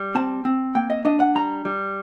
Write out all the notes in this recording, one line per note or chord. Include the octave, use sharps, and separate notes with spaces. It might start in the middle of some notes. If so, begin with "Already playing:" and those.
Already playing: G3
C4 A5
C4
A#3 G5
D#5
D4 D#5
F#5
G3 A#5
G3